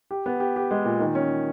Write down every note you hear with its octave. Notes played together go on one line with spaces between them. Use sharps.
G4
B3
G4
G4
G#3
A#2
D#3
C#4